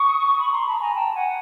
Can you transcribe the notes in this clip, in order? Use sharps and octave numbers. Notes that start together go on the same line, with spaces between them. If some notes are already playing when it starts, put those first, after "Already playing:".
Already playing: C#6 D#6
B5 C#6
A#5 C6
A5 B5
G#5 A#5
G5 A5
F#5 G#5